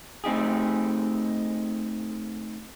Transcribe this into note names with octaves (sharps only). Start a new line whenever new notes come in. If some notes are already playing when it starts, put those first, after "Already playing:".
A3 C4 D#4 G4 G#4